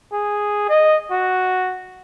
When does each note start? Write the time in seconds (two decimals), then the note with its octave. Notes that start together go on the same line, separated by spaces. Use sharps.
0.12 G#4
0.69 D#5
1.11 F#4